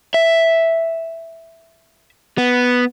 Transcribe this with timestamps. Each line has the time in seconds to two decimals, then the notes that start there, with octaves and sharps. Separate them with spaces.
0.14 E5
2.38 B3